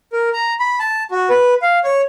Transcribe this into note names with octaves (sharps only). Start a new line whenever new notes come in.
A#4
A#5
B5
A5
F#4
B4
F5
C#5